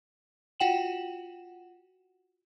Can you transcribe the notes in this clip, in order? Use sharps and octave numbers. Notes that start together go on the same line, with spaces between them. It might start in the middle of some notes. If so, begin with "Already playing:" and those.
F4 F#4 F#5 G5 E7 F#7